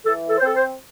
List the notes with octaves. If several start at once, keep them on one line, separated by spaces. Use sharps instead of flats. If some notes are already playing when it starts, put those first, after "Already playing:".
E3 A4
A4
C5
C4 A4
C5